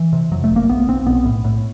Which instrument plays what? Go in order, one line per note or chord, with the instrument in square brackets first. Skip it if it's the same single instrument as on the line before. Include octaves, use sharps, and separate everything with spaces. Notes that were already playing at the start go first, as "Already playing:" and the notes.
Already playing: [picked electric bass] E3
C3
F2 F#3
A3
G1
A#3
B1 B3
B1 C4
B1 B3
A2
A2